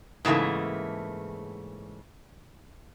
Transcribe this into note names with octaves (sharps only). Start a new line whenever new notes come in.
G#2 C#3 E3 A3 A#3